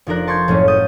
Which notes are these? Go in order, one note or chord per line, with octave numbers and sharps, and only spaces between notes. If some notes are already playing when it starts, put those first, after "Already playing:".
F1 F3 D4 A#4 F#6
A5 C6 C#6 G6 G#6
F#1 A2 F3 C#4
A5 D#6 G6